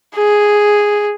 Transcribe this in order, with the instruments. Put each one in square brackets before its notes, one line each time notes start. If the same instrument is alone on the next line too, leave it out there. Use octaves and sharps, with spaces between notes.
[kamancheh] G#4